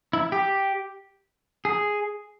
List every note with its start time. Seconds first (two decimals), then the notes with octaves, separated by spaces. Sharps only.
0.13 E4
0.32 G4
1.65 G#4